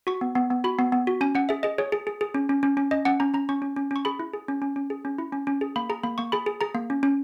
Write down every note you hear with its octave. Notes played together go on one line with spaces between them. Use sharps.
F#4 C#6
B3
B3
B3
F#4 B5
B3
B3
F#4
C#4 G#5
C#4 F#5
G#4 E5
G#4 D#5
G#4 C#5
G#4
G#4
G#4
C#4
C#4
C#4
C#4
C#4 D#5
C#4 F#5
C#4 A#5
C#4 A#5
C#4 C#6
C#4
C#4
C#4 C#6
G#4 B5
E4
G#4
C#4
C#4
C#4
G#4
C#4
E4
C#4
C#4
G#4
A#3 B5
G#4 A#5
A#3 B5
A#3 C#6
G#4 B5
G#4
G#4 A#5
A#3
C#4
C#4